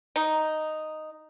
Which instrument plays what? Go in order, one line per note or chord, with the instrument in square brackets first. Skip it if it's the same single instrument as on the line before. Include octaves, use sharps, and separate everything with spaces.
[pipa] D#4